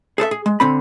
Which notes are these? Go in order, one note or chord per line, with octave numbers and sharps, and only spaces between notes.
G#4 A4 B4 E5
G#4
G#3
D3 C4 B5